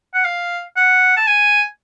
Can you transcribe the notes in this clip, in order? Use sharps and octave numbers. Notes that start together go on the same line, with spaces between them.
F#5
F5
F#5
A5
G#5